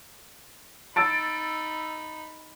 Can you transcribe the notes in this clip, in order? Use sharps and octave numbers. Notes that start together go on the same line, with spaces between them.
D#4 B5 E6 A6 D7